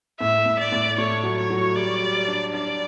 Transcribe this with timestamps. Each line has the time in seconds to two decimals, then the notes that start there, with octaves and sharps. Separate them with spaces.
0.20 A2 E5
0.46 A2
0.59 D5
0.72 A2
0.98 A3 C#5
1.23 F#3
1.38 C#5
1.50 F#3
1.75 G3 D5
2.02 G3
2.28 D4
2.53 D4 D5